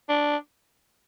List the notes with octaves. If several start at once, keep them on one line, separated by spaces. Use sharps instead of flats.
D4